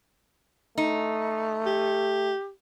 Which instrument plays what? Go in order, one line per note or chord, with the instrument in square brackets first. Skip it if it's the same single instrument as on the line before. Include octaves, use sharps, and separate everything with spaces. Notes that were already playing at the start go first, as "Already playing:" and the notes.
[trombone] A3 [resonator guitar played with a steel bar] D#4
[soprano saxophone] G4